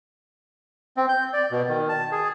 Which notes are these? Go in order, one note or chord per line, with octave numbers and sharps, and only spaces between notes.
C4
G6
D5
B2
D#3
A5
G#4